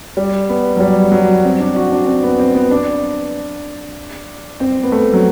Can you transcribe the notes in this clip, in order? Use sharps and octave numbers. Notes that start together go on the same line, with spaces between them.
G3
B3
F#3
G3
F#3
C4
D4
F#4
D4
C4
B3
C4
B3
D4
C4
B3
A3
F#3